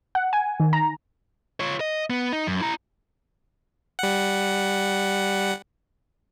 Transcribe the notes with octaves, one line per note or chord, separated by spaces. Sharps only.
F#5
G#5
D#3
A#5
F4 C#5
D#5
B3
D#4
F#2
E4 A#5
G3 F#5